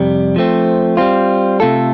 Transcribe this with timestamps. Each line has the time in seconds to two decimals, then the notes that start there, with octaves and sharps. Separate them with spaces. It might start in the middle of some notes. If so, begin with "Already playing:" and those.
Already playing: F2 C3 G3
0.36 F3 A3 C4
0.97 G3 C4 F4
1.60 C3 A3 F4 A4